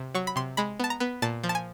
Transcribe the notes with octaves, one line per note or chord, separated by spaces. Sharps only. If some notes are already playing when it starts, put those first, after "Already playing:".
Already playing: C3
F#3 C#6
B5
C3 C6
G#3 B5
B3 A5
A#5
B3
A#2 A5
F3
A5
G#5